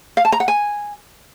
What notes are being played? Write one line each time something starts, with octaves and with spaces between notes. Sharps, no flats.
F5
A5
A#5
F#5
G#5